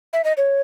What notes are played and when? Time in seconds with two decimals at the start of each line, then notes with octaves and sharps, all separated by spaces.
0.13 E5
0.24 D#5
0.37 C#5